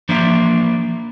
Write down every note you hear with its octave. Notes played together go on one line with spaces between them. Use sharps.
E3 F3 A#3 D4 E4